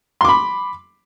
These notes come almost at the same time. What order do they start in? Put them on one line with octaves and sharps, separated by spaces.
C6 D6 B5